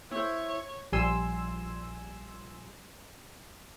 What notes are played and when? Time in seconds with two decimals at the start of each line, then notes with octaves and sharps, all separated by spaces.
0.11 E4 C5 C#5
0.92 A#1 F3 G3 G#5 C6 E6